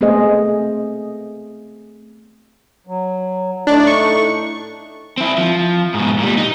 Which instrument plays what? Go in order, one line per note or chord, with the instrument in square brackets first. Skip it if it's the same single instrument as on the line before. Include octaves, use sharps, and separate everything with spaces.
[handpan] A3 B3 C4 G#4 C5 D#5
[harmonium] F#3
[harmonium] A2 A3 D#4 [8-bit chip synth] D4
[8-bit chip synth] C#6
[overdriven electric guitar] C4 E4
F3
G#2 B2
A#2 G3
D#4